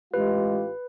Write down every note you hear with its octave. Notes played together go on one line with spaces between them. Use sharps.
A1 G#3 F4 G4 B4